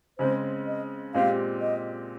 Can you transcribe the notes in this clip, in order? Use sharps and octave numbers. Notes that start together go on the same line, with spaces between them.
C#3 G#3 C4 C5
D#5
A#2 G#3 C4 G4 F5
D#5